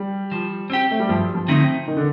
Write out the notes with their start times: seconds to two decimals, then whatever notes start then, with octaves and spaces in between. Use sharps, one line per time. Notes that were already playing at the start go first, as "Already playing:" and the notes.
Already playing: G3
0.32 F3
0.70 C4 G4
0.91 A3
1.00 G3
1.09 G2 F3
1.35 F3
1.48 D3 A3 C4 D#4
1.88 D#3
1.97 D3